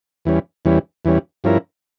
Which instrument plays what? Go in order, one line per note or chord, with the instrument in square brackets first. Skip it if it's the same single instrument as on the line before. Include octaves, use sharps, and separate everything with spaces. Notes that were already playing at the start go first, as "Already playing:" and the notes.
[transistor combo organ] E2 E3 G3 C#4
E2 E3 G3 C#4
E2 E3 G3 C#4
G2 F3 C#4 E4 A#4